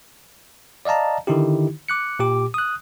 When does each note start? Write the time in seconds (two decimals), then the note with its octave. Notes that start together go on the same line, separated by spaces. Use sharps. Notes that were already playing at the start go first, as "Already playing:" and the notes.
0.85 D5 D#5 F5 A5 A#5
1.27 D3 D#3 D#4 E4 G4
1.89 D6 F#6 C#7
2.19 A#2 G4 D6
2.54 D#6 F#6